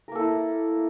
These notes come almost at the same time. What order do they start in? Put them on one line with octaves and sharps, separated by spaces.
A#4 A#3 A4 E4